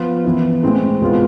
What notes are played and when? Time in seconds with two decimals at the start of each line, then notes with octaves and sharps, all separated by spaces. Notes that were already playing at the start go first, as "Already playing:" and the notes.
Already playing: F3 B3 F4
0.24 E3 B3 E4
0.63 A2 G#3 C4
1.01 B2 G#3 B3 F4